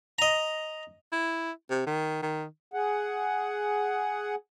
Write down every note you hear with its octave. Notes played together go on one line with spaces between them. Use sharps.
D#5 A#5
E4
C3
D#3
D#3
G#4 F#5